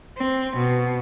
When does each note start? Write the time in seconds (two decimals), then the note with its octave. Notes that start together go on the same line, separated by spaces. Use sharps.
0.18 C4
0.56 B2